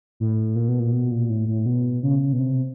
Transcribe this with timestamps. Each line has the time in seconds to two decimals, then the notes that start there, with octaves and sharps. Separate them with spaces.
0.20 A2
0.56 A#2
0.68 B2
0.79 A#2
0.92 B2
1.11 A#2
1.30 A2
1.48 A2
1.66 B2
2.03 C#3
2.32 B2
2.39 C3